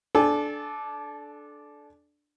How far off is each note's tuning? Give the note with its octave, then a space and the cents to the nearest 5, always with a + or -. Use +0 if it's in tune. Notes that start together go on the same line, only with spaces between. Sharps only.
D4 +0 A4 -25 G#5 -25